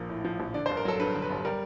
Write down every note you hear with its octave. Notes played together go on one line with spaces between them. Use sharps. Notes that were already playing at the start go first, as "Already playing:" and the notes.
Already playing: A#1 F3 A#3
A2
F3
A#1
D3 D5
G1 C5
A#4
F#3 A4
G2 B4
D3
B4
G1
G3 A#4